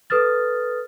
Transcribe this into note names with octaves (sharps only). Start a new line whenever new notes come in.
A4 B4 D#6 F6 A6